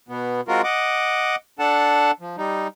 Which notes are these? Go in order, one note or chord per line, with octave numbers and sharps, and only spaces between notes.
B2 B3
G#3 C4 F4 F#4 A#4
D#5 F#5 D6
D4 A4 F#5 A5
F3
G3 D#4